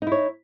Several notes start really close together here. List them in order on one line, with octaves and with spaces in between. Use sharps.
D#4 E4 C#5